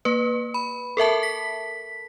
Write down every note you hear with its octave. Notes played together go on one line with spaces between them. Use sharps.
A#3 B4
B5
A4 A#4 E5 A5
B6